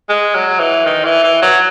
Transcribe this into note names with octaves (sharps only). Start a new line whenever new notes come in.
G#3
F#3
E3
D#3
E3
E3
F#3